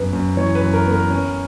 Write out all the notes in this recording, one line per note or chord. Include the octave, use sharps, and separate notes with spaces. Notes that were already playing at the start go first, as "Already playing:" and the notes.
Already playing: F#2 B3 B4
F#2
E3 C#5
B4
F#2
A#4
B3
A#4
C#4